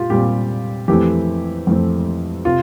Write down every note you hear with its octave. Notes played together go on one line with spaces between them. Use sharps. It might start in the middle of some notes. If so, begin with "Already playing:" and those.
Already playing: A#2 F4 G4
A#2 G3 C4 G4
F2 E3 A3 C4 G4
F2 E3 A3 C4
C3 F4